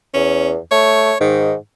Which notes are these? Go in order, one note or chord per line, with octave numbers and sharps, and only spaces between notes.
E2 C#4
A3 C#5
G#2 D#3